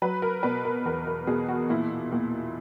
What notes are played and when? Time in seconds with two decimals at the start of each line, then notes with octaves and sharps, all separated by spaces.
0.02 F#3 B4
0.22 A#4
0.43 B2 B4
0.65 A#4
0.85 E2 A#4
1.07 A#4
1.27 B2 G#4
1.48 F#4
1.70 A#2 E4
2.12 A#2